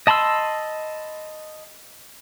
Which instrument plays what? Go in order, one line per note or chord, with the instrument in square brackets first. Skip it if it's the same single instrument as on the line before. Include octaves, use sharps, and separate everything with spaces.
[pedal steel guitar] D#5 A5 B5 C6 E6